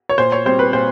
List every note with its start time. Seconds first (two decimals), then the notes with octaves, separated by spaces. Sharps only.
0.09 C#5
0.18 A#2 C5
0.32 C#5
0.45 G3 C4 C5
0.59 B4
0.73 A#2 C5